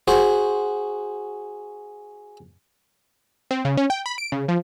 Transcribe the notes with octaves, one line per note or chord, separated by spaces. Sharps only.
F#4 G#4 C5
C4
C#3
C#4
G5
B5
D7
C#3
F3